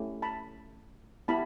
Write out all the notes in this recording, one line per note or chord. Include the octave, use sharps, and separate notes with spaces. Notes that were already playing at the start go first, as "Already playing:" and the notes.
Already playing: A3 C#4 E4 G4
A5 B5
B3 E4 G4 A5 B5